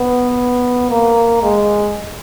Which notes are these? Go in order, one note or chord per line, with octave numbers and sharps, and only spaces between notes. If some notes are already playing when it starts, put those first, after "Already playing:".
Already playing: B3
A#3
G#3